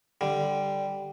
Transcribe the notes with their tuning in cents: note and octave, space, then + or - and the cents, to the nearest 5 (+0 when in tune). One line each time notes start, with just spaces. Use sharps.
D3 +0 G3 +0